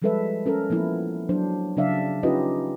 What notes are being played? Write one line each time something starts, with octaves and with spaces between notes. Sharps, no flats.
F3 G3 G#3 A4 B4 E5
C#4 A4 A#4
F3 A#3 B3 E4
F#3 D4 C5
C#3 F#3 D4 D5 E5 F5
C#4 D#4 F4 G4 B4 D#5